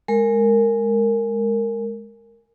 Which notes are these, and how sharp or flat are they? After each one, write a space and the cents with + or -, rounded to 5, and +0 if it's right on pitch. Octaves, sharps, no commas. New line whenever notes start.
G#3 +0 A#4 -15